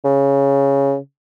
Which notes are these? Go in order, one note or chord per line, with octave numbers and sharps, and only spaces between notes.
C#3